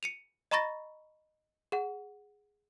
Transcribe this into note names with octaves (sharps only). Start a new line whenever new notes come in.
C#7 D#7 F7
D#5 A#5 B5 C#6 A6 A#6
G#4 F#5